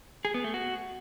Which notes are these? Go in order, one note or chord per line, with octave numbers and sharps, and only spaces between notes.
G#4
B3
A3
F#4